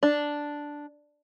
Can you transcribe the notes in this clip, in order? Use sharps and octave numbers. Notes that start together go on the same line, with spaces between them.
D4